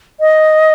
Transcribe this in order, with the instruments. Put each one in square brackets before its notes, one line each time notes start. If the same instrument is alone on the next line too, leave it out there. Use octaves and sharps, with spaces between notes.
[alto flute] D#5